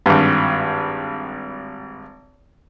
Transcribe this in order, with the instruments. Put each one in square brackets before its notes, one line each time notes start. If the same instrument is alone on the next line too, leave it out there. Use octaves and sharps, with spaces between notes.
[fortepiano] G#1 G2